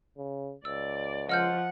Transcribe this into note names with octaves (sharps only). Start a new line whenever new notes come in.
C#3
C#2 D5 E6
F3 D#5 F#5 F6 G6